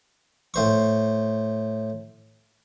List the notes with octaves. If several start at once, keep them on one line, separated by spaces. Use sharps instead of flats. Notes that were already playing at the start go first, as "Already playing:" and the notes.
A2 C5 C#6